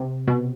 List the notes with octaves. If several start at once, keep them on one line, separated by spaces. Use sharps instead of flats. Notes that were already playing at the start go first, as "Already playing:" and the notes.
Already playing: C3
B2